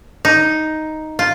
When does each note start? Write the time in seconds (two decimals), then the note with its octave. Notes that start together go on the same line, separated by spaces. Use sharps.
0.25 D#4
1.19 F4